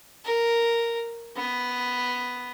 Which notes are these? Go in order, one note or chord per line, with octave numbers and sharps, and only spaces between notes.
A#4
B3